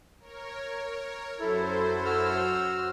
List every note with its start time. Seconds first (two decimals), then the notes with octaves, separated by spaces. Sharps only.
0.19 A#4 C#5
1.40 F#2 F#3 E4 A4 C5
2.05 F#4 E6 F6